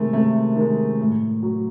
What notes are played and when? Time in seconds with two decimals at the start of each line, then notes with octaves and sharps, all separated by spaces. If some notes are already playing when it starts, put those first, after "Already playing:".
Already playing: C3 D#3 G#3 A3
0.13 C3 A3
0.56 D#3 G#3
0.99 A2
1.43 F#3